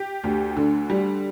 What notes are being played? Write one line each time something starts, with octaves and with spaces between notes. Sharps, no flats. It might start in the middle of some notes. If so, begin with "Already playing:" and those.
Already playing: G4
D2
D3
G3